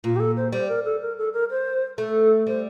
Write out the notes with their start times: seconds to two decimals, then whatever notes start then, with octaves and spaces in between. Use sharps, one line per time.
0.04 A#2 F4
0.16 G4
0.20 A4
0.37 C5
0.52 G3 C5
0.69 A#4
0.85 A4
1.02 A#4
1.18 A4
1.33 A#4
1.50 C5
1.98 A3 A4
2.47 G3 C5